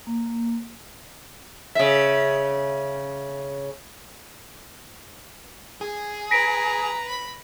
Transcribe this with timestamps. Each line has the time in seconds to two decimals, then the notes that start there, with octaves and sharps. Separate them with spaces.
0.07 A#3
1.75 C#3 E5
5.81 G#4
6.31 B4 A#5 A#6 B6 D7
7.08 B5